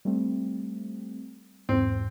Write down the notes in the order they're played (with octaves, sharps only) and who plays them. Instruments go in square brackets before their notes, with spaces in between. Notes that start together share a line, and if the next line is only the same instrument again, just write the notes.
[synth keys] G3 A3 C4
[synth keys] E2 G#2 [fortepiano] C4